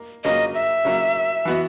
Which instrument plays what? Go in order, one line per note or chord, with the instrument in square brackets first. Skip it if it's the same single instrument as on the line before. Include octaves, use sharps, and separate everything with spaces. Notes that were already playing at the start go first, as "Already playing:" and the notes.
Already playing: [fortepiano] A#3
[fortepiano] C#3 F#3 A#3 [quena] D#5
[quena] E5
[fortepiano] C#3 F#3 A#3
E3 B3 F#4